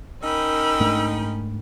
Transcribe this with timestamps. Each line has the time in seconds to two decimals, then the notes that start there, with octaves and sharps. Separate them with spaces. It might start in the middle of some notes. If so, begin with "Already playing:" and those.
0.23 C#4 D#4 A#4 G5 B5 E6
0.80 G#2 A3 D4